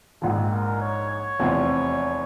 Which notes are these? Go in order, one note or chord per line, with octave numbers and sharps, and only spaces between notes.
A#1 G#2 F3 C4
A#4
C#5
C#5
F1 E2 C3 F3 C4